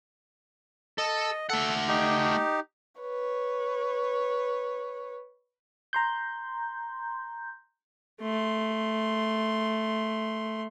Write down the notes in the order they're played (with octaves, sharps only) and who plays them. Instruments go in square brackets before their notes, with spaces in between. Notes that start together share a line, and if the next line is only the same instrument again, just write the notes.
[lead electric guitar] A4 [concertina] D#5
[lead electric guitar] A3 F#5 [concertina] A4
[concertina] D#4 G4
[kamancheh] B4 C#5
[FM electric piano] A#5 C6 G6
[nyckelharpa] A3 C6